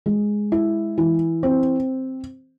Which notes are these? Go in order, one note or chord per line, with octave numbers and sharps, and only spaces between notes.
G#3
E4
E3
C4